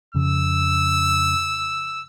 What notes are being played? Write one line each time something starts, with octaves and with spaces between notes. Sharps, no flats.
F2 C#3 E6